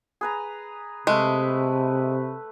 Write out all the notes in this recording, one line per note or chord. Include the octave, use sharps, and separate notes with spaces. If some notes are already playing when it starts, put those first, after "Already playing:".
G#4 B4 A#5
C3 G#3 A3 B4